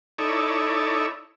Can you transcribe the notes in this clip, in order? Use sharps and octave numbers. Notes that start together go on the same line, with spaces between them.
D#4 E4 A4 C#5 D5